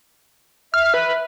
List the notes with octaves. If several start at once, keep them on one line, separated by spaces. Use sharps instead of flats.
E5 F6
B4